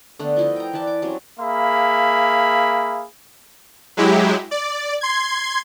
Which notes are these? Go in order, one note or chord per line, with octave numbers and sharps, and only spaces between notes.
D3 A3 B3 B4
F3 E4 D#5
G5 A#5
E3 B4 D5 A5
D6
F#3 G3 C4 C#4
A#3 G#4 E5 F5 B5
F#3 G#3 E4 G4
D5
C6 G#6